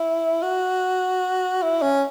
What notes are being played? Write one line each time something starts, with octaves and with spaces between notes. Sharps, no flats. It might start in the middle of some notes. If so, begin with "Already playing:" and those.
Already playing: E4
F#4
E4
C#4